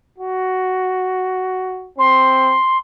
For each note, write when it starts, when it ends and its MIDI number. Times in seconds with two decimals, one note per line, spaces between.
0.18 1.90 66
1.98 2.55 60
1.98 2.77 84